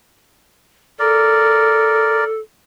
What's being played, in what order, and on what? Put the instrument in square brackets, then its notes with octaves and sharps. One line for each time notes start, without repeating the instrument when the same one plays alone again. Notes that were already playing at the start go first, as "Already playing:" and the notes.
[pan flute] A4 [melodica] A#4 D5